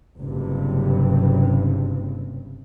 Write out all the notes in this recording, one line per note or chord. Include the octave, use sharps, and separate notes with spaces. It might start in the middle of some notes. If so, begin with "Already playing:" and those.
F#1 G2 C3